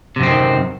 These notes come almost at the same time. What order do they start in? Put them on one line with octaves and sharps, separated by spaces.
C3 F#2 C4 D#3